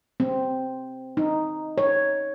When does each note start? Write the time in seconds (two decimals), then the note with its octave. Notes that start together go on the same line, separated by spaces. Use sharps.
0.20 C4
1.17 D#4
1.78 C#5